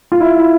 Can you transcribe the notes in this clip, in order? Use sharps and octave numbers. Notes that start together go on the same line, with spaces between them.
F4
E4
E4